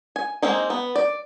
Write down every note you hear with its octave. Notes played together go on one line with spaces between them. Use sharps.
G#5
G#3 A#3 C4 D#4
B3
D5